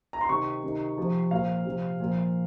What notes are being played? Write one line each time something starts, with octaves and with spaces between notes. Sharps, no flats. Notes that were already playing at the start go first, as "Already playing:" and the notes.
A#5
C6
C3 D#3 C#6
C3 D#3
C3 F3
A#2 F3 F5
C3 F3
A#2 F3